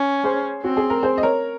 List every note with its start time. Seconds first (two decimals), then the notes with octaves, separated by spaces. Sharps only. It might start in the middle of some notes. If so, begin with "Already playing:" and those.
Already playing: C#4
0.24 G#4 C5
0.63 C4 F#4
0.77 G#4
0.90 A#4
1.03 G#4 C5
1.18 D#5
1.23 A#4 C#5